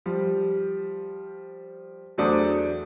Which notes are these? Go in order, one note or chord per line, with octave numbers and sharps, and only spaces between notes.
F3 G3
E2 F#3 A3 D4 C5 D#6